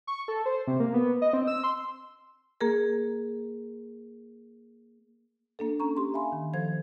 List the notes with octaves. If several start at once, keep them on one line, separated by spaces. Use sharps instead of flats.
C#6
A4
C5
C3
A#3
B3
D#5
C4
E6
C6
A#3 G#4 A#4
A#3 D4 A4
C#4 A#5 C#6
G4 C6
E5 F5 G#5 B5 C6
D#3
D#3 F3 A4 C5 G#6